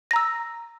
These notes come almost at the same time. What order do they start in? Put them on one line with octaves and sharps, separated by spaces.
A#6 A#5 E6